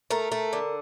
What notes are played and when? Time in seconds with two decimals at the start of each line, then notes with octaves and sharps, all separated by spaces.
0.10 A3 A#4
0.32 A3
0.53 D3